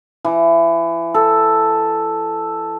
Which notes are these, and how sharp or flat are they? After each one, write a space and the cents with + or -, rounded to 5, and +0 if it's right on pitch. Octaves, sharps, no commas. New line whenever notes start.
E3 +25
A4 +0